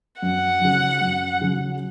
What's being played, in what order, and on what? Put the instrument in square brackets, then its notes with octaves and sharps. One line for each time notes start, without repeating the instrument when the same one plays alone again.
[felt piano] F#2 [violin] F#5
[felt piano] C#3 F#3
F#2
C#3 F#3